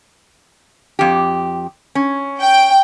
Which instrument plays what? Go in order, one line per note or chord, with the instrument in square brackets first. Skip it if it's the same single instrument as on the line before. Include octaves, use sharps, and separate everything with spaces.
[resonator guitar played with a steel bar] F2 G4
C#4
[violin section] G5